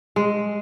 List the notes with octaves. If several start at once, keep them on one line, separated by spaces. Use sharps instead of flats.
G#3